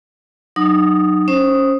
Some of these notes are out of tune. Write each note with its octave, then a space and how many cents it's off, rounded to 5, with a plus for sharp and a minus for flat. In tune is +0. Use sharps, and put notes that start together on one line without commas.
F#3 +0 D#4 -35 D#6 +0
C#4 +0 C5 +20 D#6 +0